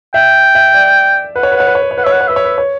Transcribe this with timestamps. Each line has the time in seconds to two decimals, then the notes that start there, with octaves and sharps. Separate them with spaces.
0.14 E5 G5
0.55 E5
0.74 D5
1.36 B4 F#5
1.43 C#5
1.52 B4
1.56 C#5 F#5
1.67 B4
1.75 C#5
1.82 B4
1.91 C#5
1.98 B4 F#5
2.04 E5
2.06 C#5
2.12 B4 F#5
2.21 C#5
2.28 B4 E5
2.36 C#5
2.44 B4
2.58 C#5